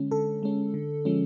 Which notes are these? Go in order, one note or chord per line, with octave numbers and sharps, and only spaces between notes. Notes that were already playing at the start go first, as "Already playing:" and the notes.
Already playing: D3 G#3 C#4
D3 A4
G#3 C#4
D3
F3 G#3 C#4